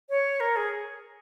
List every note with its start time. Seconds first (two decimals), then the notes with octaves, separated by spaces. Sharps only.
0.10 C#5
0.40 A#4
0.56 G#4